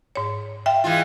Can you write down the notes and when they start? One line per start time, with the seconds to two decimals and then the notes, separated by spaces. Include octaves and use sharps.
0.16 G#2 C#5
0.66 E5 F5 G5
0.84 E3 G#3 F4